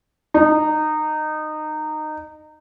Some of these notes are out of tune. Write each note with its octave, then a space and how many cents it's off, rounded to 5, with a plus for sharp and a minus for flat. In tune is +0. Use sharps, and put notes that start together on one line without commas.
D#4 -20